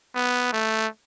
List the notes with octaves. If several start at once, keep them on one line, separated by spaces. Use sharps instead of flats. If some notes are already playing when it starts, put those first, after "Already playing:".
B3
A3